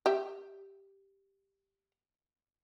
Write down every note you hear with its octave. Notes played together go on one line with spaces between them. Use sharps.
G4 E5